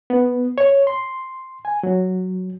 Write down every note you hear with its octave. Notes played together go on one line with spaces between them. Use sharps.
B3
C#5
C6
G#5
F#3